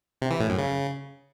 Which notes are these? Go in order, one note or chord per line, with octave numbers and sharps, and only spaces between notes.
C3
E3
A2
F#2
C#3